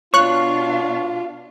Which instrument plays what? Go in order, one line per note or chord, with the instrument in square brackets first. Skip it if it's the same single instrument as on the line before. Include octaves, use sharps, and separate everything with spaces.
[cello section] B2 D4 F5 [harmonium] F4 [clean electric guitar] C#5 [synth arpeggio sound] C#6 F#6